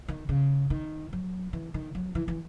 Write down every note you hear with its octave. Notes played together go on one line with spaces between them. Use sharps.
D#3
C#3
D#3
F#3
E3
D#3
F#3
E3
E3